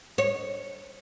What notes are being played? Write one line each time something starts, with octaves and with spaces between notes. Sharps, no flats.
C#5